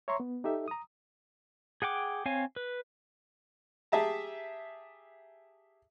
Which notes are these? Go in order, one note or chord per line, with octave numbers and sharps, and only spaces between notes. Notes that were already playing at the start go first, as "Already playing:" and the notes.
C#5 E5 A#5 C6 C#6
B3
D#4 G4 A4 E5
A#5 D#6
G#4 F#5 G5 D6
C4 C#5 F5 G#5
B4
G4 G#4 E5 A5 A#5